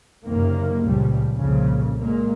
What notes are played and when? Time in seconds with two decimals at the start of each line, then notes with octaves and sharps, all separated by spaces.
0.25 F#1 F#2 C3 D#3 A#3
0.83 C#2 A#2 C#3 F3 G3
1.36 C2 F2 A#2 C#3
2.00 A#2 G#3 A#3